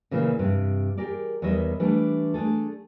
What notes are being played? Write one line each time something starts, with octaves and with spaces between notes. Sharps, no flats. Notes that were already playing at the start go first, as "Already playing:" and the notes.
A#2 C#3 E3 A3 A#3
G2 C3
G4 G#4 A#4 D5
E2 D#3 G3 C#5 D#5 E5
E3 G3 A3 D4
A3 D4 G#4 A4